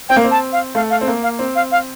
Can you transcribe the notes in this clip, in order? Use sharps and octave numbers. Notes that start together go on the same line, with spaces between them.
C4 G5
A#3
C4
A5
F5
A3 F5
F5
C4
A#3
F5
C4
F5
F5